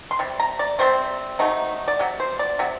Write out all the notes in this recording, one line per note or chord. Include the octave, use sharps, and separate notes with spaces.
C6
C3 G3
A#5
D5
C3 G3 C4 C5
C3 F#3 A3 D#4
D5
C3 F#3
C5
D5
C3 F#3